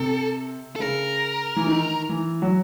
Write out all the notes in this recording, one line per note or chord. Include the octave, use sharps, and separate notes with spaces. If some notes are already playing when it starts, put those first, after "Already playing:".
Already playing: C3 A4
A4
C#3 A#4
E3
D#3
E3
F#3